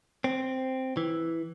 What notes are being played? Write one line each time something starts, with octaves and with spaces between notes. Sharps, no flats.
C4
E3